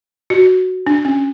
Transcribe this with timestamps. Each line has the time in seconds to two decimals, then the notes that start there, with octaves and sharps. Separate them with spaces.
0.30 F#4
0.87 D4
1.05 C#4